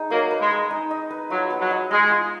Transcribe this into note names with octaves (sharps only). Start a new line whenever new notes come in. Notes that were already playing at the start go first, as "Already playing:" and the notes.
Already playing: D#4 G#4
F#3 A#3 D#5
B4
G#3
G#4
D#4
D#5
B4
F#3 F4
B3
F#3
D#5
G#3 G#4
F4